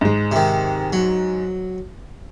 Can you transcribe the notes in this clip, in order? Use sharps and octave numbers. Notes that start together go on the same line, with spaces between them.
G#2 G#3
C3 D#3
F#3